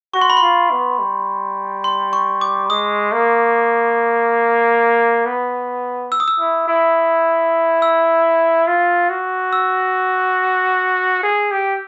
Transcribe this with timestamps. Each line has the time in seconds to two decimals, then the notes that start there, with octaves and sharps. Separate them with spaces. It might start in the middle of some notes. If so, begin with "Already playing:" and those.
0.14 F#4 C#6
0.21 C6
0.30 B5
0.37 C6
0.42 F4
0.71 B3
0.99 G3
1.84 C6
2.13 C#6
2.41 D6
2.70 G#3 D#6
3.12 A#3
5.26 B3
6.12 E6
6.20 D#6
6.28 E6
6.39 E4
6.68 E4
7.82 E6
8.67 F4
9.10 F#4
9.53 E6
11.23 G#4
11.51 G4